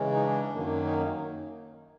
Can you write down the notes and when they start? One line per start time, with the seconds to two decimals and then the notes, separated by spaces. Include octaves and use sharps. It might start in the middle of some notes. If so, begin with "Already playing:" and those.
Already playing: C#3 E3 G#3 C#4
0.12 D#4
0.22 D4
0.52 F#2 D#3 F#3 A#3
0.83 C#4 D#4